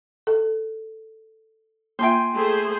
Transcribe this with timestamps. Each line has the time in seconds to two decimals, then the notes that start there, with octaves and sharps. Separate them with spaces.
0.27 A4
1.99 A#3 F4 E5 G5 G#5 C6
2.34 A3 G#4 C5